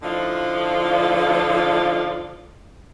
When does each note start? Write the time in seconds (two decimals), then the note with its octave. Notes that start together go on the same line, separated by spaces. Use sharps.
0.02 A2 D3 F3 D#4 F4 D5